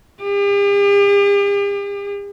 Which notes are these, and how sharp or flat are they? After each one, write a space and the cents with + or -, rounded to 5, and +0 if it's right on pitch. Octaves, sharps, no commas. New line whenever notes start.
G4 +45